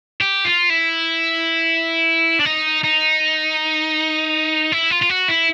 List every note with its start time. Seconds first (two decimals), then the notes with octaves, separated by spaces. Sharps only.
0.21 G4
0.45 F4
0.70 E4
2.40 D4
2.46 D#4
2.84 D#4
4.72 E4
4.90 F4
5.02 F4
5.09 F#4
5.28 E4